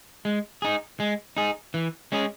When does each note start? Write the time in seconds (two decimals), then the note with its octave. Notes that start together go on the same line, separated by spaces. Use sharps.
0.25 G#3
0.62 D#4 G#4
1.00 G#3
1.37 D#4 G#4
1.74 E3
2.12 G#3 C#4 G#4